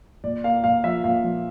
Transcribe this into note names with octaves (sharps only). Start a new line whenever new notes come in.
A#2 D5
A#3 F5
A#2 F5
F3 E5
A#2 F5
F3